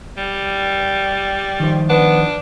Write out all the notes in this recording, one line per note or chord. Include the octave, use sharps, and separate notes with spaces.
G3
D#3 F3 C5
B3 D4